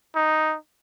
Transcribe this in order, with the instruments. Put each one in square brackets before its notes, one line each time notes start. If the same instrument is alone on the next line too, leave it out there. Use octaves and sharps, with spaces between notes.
[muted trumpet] D#4